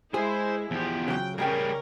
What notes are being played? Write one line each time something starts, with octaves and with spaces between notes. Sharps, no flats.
G#3 E4 G#4 C5
E2 F3 G4
C#3 F#3 G5
C#2 C#3 G3 C#4 G#4 A#4 G5